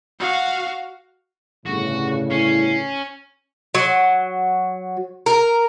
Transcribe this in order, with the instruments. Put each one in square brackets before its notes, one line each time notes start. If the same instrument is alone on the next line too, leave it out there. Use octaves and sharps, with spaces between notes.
[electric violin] F#4 F5
[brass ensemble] G1 A2 C#3 [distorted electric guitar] F#4
[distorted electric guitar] C#4 [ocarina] E4 [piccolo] C7
[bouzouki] F#3
A#4